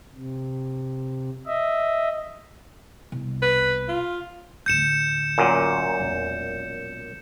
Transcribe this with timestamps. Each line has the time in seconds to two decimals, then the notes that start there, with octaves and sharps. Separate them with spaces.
0.15 C3
1.46 D#5 E5
3.12 C2 B2
3.42 B4
3.88 F4
4.66 A1 D2 G6 C#7 E7
5.38 F#2 A#2
6.00 E1 A#1